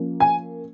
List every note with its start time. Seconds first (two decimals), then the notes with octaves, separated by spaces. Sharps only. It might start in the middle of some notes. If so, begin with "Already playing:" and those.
Already playing: F3 A#3 C#4
0.20 G#5